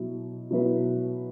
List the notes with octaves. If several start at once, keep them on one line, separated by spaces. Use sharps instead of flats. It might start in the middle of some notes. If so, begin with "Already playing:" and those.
Already playing: B2 F#3 E4
B2 F#3 E4 B4